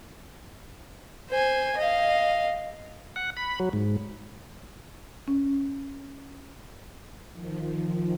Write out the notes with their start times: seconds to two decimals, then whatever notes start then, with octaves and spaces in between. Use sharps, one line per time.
1.30 C5 G#5
1.77 D#5 F5
3.16 F#5
3.37 B5
3.60 F#3
3.73 G#2
5.28 C#4
7.32 D#3 F3